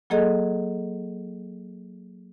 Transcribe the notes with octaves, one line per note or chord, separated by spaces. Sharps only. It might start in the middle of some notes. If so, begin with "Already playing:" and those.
F#3 A#3 G#4 A4 D#5